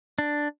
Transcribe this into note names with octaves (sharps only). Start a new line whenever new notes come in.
D4